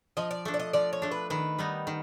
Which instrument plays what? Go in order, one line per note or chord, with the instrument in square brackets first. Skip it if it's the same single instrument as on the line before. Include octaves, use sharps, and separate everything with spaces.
[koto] F3 [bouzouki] D#5
[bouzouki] D5
[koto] A3 D4
[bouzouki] D5
D#5
[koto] F3 [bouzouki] D5
[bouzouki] C#5
[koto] A3 D4
[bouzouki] B4
[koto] D#3 [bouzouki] B4
[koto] G3 B3 D#4
D#3